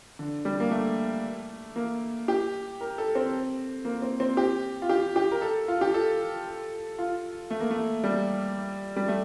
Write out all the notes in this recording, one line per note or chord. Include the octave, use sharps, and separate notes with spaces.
D3
G3
A#3
A3
A#3
G4
A#4
A4
C4
A#3
C4
C4
G4
F4
G4
G4
A#4
A4
F4
G4
A4
F4
A3
A#3
A3
G3
G3
A3